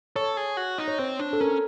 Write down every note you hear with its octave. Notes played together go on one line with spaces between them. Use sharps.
A4 C#5
G#4
F#4
D#4
C#5
C4 C5
D4
A4
C#4 A#4